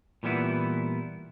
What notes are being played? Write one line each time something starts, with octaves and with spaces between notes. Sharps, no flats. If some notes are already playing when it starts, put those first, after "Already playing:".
A#2 E3 G3 B3 E4